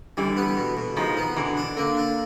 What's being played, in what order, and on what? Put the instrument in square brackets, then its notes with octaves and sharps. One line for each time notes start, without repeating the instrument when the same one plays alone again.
[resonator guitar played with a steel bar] D3 E3 [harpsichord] G3
[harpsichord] B3
B2
B2
[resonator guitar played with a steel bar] D#3 F3 [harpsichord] G#3
[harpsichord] B3
[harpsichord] B2 [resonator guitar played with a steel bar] D3 E3
[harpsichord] D4
[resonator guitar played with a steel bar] D3 [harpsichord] A#3
[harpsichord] D4